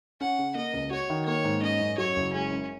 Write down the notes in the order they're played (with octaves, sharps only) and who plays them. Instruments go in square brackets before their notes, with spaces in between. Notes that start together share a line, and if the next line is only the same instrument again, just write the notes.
[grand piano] C#4 [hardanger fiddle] F#5
[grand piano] C#3
[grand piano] A#3 [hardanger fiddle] D#5
[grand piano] C#2
[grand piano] F#4 [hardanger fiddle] C#5
[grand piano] D#3
[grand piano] A#3 [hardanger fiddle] C#5
[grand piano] G#2
[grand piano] C#4 [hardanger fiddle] D#5
[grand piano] F#2
[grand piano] F#3 [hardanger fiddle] C#5
[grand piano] F#1
[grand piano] G#3 [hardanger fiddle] C#4
[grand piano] F#2